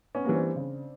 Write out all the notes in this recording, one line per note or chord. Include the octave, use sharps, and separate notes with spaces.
B3 C#4
E3 G3 A#3
C4 D4
C#3